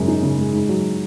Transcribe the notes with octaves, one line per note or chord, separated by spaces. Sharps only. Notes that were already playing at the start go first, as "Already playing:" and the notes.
Already playing: F#2 C#3 G#3
D#4
C#3
G#3
G#2
F#3